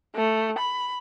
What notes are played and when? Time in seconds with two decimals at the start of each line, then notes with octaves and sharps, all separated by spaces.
0.16 A3
0.58 B5